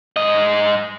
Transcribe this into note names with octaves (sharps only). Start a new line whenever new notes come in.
G#2 D#5